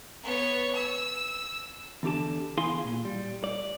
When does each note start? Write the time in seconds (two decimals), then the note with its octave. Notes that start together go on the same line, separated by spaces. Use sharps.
0.23 B3 C#5
0.75 E6
2.03 E2 D3 G4 A5
2.58 E2 E4 G#4 F5 G#5 C6
2.85 A#2
3.05 G3
3.44 D5